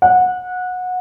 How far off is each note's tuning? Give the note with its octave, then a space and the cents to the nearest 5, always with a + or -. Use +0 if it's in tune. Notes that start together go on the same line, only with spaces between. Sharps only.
F#5 -20